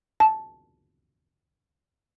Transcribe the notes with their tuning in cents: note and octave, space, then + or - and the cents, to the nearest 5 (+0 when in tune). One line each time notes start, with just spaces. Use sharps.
A5 -10